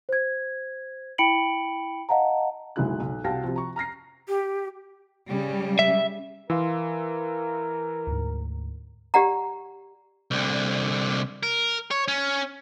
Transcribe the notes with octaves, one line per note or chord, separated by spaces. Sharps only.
C5 G#6
E4 G5 B5 C#7 D7 F#7
D#5 F5 F#5 A5 A#5
F#1 B1 G#3 E4 F#4 F#6
B1
C2 F#4 F5 G5 A5 A#6
C3 F3
A#5 C#6
A#5 F6 A#6 C7
G4
C#3 G3
E5
E3 A#4 F5 C6 E6
D2 G#2
G4 D5 F#5 A#5
C2 D3
A#4
C#5
C#4